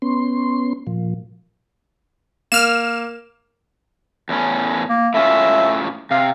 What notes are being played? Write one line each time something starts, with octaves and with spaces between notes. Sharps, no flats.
B3 C#4 C6
A#2 F3
A#3 F6 E7
E2 A2 C#4
A#3
A2 C#4 F4 E5
C3 F5